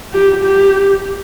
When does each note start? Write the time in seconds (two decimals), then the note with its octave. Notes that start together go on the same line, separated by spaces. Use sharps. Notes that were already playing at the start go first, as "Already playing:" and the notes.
0.13 G4
0.44 G4